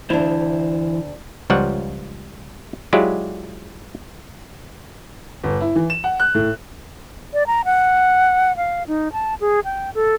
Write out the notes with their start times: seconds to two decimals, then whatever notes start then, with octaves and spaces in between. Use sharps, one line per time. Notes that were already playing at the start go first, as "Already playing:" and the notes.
0.10 D2 E3 D4 E4 C5
1.50 C#2 F3 G3 C#5 F#5
2.93 F#3 G#3 E4 F4 G4 D5
5.44 G1
5.61 E4
5.76 E3
5.90 E7
6.04 F#5
6.20 F#6
6.35 A2
7.33 D5
7.47 A#5
7.65 F#5
8.57 F5
8.87 D#4
9.13 A5
9.40 G#4
9.65 G5
9.95 A4